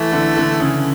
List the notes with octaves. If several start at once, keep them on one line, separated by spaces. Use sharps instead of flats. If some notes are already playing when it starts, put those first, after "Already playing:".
Already playing: E3 A3
D3
D3
C#3